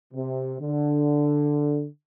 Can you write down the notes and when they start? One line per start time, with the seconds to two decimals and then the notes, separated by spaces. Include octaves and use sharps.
0.13 C3
0.60 D3